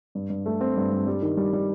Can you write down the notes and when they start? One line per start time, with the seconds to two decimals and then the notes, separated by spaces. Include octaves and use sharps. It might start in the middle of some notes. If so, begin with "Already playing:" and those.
0.15 G2
0.30 G2
0.46 A3
0.61 C4
0.77 G2
0.92 G2
1.07 G3
1.22 D#3
1.37 G3
1.53 G3